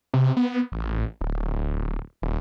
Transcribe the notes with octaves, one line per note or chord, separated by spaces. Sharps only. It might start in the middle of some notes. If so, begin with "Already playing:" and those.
C3
B3
A1
D1
D#1